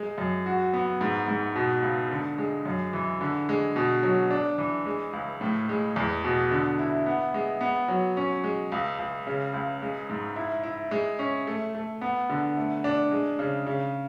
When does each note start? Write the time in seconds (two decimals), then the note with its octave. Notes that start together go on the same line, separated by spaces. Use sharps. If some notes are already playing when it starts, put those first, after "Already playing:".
Already playing: G#3
0.18 F#2
0.46 F#4
0.74 B3
1.01 G#2
1.28 G#2
1.56 B2
1.83 C#2
2.11 D3
2.38 G#3
2.66 F#2
2.93 E3
3.21 D3
3.49 G#3
3.76 B2
4.03 F#3
4.31 D4
4.58 E3
4.86 G#3
5.13 C#2
5.41 A2
5.69 G#3
5.96 E2
6.24 B2
6.51 D3
6.79 E4
7.06 B3
7.34 G#3
7.61 B3
7.88 F#3
8.17 C#4
8.44 G#3
8.72 C#2
8.99 C#2
9.27 C#3
9.54 C#2
9.82 G#3
10.10 G#2
10.36 E4
10.63 E4
10.91 G#3
11.19 C#4
11.47 A3
11.75 A3
12.01 B3
12.30 D3
12.56 A3
12.84 D4
13.11 G#3
13.39 C#3
13.67 C#3